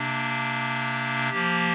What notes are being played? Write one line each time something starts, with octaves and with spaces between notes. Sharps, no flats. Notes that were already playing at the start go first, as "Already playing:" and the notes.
Already playing: C3 A#3 D4
F3 A#3 G4